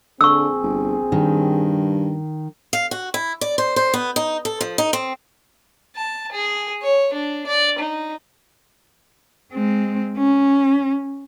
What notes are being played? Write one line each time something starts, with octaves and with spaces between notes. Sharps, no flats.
A#1 D3 C4 G#4 C#6 E6
G1
G2 D#3
F5
F#4
E4
D5
C5
C5
B3
D#4
A4
F3
D#4
C4
A5
G#4
C#5
D4
D5
D#4
G#3 C4
C#4